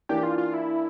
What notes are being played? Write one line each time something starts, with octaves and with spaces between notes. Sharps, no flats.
E3 A#3 D4 G4
F4
F4
E4